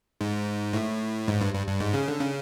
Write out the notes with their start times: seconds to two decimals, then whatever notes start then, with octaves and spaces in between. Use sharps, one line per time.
0.21 G#2
0.73 A2
1.28 G#2
1.41 G2
1.54 G2
1.67 G2
1.81 G#2
1.94 C#3
2.08 D3
2.21 C#3